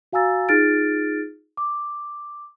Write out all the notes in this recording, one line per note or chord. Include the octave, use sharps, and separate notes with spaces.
F#4 F5 G#5 A#5 E6 A6
D#4 F4 G#4 F6 A6 D7
D6